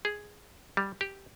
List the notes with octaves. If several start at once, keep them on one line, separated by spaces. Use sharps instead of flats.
G#4
G3
G4